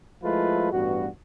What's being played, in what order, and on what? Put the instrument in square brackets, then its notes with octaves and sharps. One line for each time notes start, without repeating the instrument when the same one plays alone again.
[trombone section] F3 G#3 A3 E4 F4 B4
A1 G2 B3 F#4